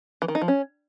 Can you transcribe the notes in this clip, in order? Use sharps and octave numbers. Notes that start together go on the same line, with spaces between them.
E3
D#3
D#4
F3
C#4